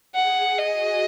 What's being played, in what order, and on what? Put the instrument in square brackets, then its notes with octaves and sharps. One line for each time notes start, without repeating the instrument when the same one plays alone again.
[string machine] G#4 [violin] F#5
[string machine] G#4
[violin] D#5
[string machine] F#4